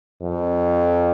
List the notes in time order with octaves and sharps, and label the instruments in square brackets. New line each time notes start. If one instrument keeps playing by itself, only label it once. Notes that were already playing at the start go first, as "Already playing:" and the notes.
[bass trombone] F2